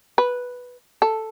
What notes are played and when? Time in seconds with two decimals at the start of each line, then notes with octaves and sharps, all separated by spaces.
0.18 B4
1.02 A4